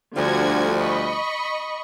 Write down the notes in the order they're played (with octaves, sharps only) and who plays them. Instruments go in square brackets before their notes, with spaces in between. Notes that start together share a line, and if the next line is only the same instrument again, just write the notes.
[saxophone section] D2 F3 G3 [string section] D3 F#4 G#6
[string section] D#5 B5 C#6